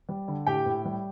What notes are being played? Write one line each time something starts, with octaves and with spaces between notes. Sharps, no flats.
G3
D3
A2 G4 G5
A2
G3